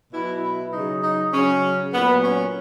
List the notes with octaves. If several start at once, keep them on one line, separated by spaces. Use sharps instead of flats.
B2 F#3 E4
E4
C#3 F#3 D#4
D#4
C#3 F#3 C#4
A#2 F#3 B3
C#4